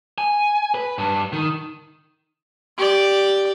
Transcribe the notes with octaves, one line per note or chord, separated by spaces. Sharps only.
G#5
B4
G2
D#3
G4 D5